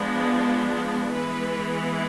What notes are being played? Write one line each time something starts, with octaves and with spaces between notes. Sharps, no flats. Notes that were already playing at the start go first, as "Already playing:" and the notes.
Already playing: F3 G#3 B3 D4
E3 G#3 B3 B4